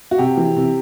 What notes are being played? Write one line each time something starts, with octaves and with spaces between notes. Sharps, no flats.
F#4
C3 G4
E3
C3